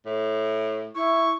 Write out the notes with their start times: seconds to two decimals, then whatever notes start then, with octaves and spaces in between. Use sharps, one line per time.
0.06 A2
0.96 E4 C#6